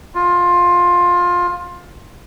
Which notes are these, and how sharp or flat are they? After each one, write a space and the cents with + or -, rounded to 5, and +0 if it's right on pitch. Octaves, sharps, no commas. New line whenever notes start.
F4 +15